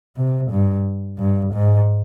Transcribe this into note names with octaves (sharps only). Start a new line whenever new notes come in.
C3
G2
G2
G#2